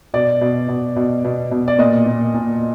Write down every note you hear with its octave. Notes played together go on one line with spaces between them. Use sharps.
B2 D5
B2
B2
B2
B2
B2
D5
A#2 D#5
A#2
A#2